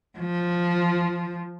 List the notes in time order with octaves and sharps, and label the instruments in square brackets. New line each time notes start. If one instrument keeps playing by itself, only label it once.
[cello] F3